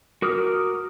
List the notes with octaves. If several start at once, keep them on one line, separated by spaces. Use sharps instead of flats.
F#4 A#4 D6 D#6 F6